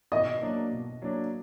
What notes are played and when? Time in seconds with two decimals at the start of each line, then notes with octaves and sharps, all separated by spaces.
0.12 B2 D#5
0.42 F#3 A#3 D4
0.71 B2
1.02 F#3 A#3 D4